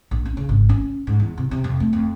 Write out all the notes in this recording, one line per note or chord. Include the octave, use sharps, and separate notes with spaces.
A#1
C#4
C#3
G#1
C#4
G#2
E2
C3
C3
F2
A3
F2